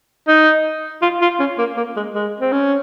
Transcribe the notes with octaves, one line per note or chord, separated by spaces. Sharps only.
D#4
F4
F4
C#4
A#3
A#3
G#3
G#3
C4
C#4